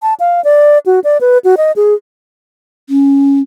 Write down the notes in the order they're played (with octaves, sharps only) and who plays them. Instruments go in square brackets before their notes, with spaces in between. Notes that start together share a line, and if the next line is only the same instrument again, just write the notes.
[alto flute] A5
F5
D5
F#4
D5
B4
F#4
D#5
G#4
[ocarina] C#4